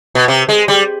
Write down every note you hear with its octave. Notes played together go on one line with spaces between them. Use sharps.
B2
C3
G#3
G3